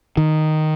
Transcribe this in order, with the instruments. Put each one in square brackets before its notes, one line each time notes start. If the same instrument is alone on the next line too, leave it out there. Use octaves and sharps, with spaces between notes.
[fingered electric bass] D#3